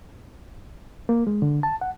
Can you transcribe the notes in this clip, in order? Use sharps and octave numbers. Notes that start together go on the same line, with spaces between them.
A#3
G#3
D3
A5
F#5